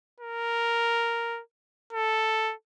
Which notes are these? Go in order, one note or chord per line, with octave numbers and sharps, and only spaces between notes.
A#4
A4